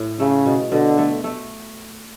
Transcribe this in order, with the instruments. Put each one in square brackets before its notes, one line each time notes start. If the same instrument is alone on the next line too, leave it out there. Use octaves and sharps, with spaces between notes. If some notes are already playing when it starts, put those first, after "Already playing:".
Already playing: [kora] A2
[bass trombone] C#3 [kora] A3
[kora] B2
[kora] B2 [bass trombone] D3
[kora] A3
A3